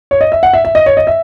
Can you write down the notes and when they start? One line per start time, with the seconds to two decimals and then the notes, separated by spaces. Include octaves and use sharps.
0.11 C#5
0.21 D#5
0.32 E5
0.43 F#5
0.53 E5
0.65 E5
0.75 D#5
0.86 C#5
0.97 D#5
1.07 E5